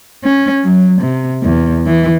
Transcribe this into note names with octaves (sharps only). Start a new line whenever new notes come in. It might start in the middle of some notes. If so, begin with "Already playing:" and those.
C#4
F#3
C3
E2
E3